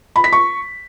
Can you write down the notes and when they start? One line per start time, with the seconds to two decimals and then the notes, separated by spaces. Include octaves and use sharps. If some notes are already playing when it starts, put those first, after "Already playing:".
0.16 B5
0.24 B6
0.32 C#6